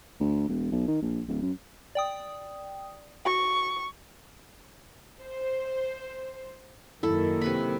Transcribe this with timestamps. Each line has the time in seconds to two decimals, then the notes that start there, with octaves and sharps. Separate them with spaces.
0.20 D2
0.49 E1
0.72 B1
0.88 D#3
1.02 A#1
1.28 D1
1.42 F#2
1.95 D5 G5 D#6
3.26 F#4 C#6
5.22 C5
7.03 F#2 D#3 A#3 E4 A4
7.41 C3 B4 B5